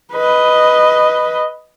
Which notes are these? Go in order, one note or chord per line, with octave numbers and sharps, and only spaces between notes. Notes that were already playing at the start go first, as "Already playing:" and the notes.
B4 D#5